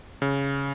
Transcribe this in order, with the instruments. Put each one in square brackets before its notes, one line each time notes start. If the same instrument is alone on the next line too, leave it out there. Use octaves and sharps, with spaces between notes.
[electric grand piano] C#3